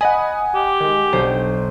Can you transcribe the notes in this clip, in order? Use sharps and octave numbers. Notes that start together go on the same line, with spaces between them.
D#5 F#5 G#5 B5 D#6
G4
D#3 G#3
B1 D4 C5